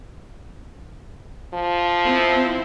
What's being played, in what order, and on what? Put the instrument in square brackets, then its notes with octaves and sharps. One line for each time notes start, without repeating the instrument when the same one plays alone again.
[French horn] F3
[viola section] C4 E4